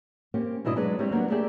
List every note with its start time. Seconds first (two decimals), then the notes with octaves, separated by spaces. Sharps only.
0.34 A#3 C4 C#4 G4
0.65 G#2 B2 D4 E4 B4 D#5
0.76 F#3 G#3 D4 G#4 B4 D5
0.99 G3 G#3 C4 E4 C#5 E5
1.11 F#3 A#3 B3 D4
1.30 A3 A#3 G4 G#4 D5 E5